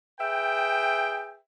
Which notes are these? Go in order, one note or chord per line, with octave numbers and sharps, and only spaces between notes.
G#4 B4 E5 G5